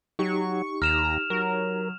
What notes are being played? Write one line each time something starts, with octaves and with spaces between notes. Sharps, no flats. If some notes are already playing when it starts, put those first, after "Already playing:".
F#3 D#4 G4 C#6
D#2 A#5 F6 E7 F7
F#3 A#4